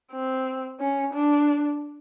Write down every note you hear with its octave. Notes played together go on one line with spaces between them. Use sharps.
C4
C#4
D4